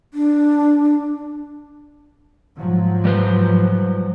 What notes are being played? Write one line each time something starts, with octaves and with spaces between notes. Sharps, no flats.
D4
G#2 F3 F#3
G3 B4 C5